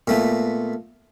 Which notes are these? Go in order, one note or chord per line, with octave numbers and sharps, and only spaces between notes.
A#2 A3 B3